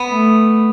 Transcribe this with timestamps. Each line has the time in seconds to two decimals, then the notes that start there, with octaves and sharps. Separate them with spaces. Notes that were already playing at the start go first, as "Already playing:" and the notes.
Already playing: B3
0.09 A3